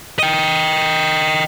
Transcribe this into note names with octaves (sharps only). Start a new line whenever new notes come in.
D#5 G5